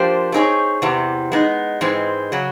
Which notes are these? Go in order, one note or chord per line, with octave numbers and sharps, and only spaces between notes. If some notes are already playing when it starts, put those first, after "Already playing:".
Already playing: F3 A#3 D4 G4 C5
A3 C4 D#4 G#4 C#5
E2 C3 E3
G#3 B3 D#4
G#2 E3 G#3 C4
C#3 F#3